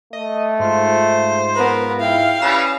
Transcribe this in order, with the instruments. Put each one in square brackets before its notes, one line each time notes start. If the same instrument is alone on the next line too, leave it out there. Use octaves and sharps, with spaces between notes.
[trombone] A3 [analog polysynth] D#5
[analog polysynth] G#2 F4 [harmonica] C5
[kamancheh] B3 A#4
[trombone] E4 [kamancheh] F5 [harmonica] G5
[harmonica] E3 G3 B4 [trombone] C#4 [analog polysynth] D#6 A#6 E7